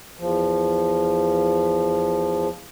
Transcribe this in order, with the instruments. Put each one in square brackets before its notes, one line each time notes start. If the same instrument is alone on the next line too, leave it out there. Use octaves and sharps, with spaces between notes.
[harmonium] E2 F3